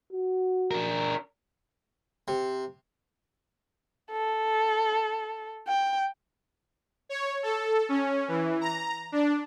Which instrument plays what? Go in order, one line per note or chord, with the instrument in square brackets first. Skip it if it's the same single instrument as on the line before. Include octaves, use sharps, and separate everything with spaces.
[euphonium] F#4
[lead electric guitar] D4 A#4
[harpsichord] C3
[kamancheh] A4
G5
[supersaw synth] C#5
A4
C#4
E3
A#5
D4